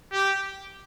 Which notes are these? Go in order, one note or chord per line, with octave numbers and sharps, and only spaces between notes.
G4